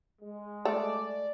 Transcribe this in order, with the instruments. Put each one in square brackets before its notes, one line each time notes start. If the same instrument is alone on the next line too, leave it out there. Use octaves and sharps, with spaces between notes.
[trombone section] G#3
[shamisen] A3 [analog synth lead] D5